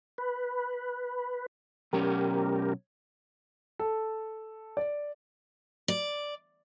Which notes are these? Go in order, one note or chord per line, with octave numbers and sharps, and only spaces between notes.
B4
B2 F#3 C#4 G4 A#4
A4
D5
D5